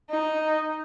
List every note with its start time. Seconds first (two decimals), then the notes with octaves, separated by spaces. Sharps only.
0.10 D#4